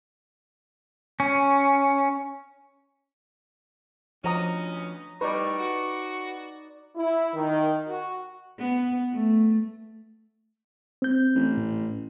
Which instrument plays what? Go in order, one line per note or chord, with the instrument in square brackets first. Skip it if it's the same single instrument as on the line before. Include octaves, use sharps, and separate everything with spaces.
[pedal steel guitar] C#4
[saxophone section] D2 C#4 B4 [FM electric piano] F3 [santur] D#5 A#5 D#6
[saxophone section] A2 G3 [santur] D#4 D5 [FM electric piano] B4 [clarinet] C#6
[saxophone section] F#4
[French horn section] E4
D#3
F#4
[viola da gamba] B3
A3
[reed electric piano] C4 G6
[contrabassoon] A1
[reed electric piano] A2